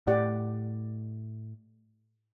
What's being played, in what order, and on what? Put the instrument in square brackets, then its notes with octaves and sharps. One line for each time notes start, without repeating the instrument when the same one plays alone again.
[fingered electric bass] A2 [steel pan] G4 D5 F#5